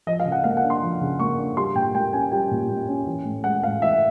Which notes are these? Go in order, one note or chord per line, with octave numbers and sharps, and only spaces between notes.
F3 D#5
F5
C#3
F#5
A#3 F5
F#5
D4
C6
F3
C#3
A#3 C#6
D4
G3 C6
A#2 G5
A#3 G5
C#4 G#5
G3 G5
A#2
A#3
C#4
E3
A2
G#3 F#5
A2 F5
E3 E5